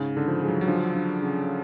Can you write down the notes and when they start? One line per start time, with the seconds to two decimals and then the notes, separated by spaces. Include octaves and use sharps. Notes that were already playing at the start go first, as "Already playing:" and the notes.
Already playing: G#2 C#3
0.15 G#2 D3
0.28 F3
0.42 G#3
0.48 F#3
0.61 F#3
0.68 F3 D4
0.95 D4
1.22 C#3